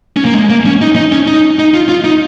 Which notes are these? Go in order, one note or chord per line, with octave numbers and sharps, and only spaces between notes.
C#4
A#3
G#3
A#3
C#4
D#4
D#4
C#4
D#4
D#4
F4
F4
D#4